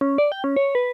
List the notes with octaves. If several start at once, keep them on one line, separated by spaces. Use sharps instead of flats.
C#4
D5
G5
C#4
C#5
B4